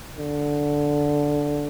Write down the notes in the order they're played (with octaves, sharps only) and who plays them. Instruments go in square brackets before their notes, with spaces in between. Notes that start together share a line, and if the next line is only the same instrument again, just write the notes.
[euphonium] D3